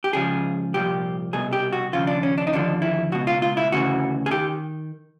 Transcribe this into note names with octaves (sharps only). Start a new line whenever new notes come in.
G4
C#2 C#3 F3 G#4
C2 A#2 F3 G4
C2 B2 G#4
G4
F#4
D#2 C#3 F3 F4
D4
C#4
D4
D#4
D#2 D3 F3 D4
E4
C#2 B2 F#4
F4
F4
E4
D2 C#3 E3 F#4
G#4
D#3 G4